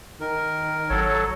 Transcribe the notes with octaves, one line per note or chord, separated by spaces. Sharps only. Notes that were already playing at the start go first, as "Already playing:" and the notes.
D#3 A#4
G#1 F#3 A4 C#5